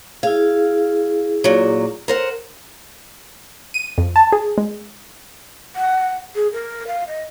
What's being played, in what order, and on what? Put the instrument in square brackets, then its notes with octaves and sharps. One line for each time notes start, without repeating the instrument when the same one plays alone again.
[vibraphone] E4 G#4 [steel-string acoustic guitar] F5
[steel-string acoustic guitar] A#2 F#3
A#4 C5 F#5
[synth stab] D#7
F2
A5
G#4
G#3
[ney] F#5
G#4
A#4
F5
D#5